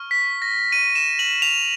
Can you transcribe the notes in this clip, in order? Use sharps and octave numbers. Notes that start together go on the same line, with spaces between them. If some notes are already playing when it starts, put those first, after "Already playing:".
Already playing: C#6 F6
B6
A#6
D#7
E7
F#7
F7